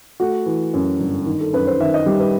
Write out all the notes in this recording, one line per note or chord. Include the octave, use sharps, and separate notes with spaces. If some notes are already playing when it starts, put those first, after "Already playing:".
A3 F#4
E3
F#2
G1
D#3
A4
F#2 B4
C5
D#3 E5
D#5
G3 G4
B4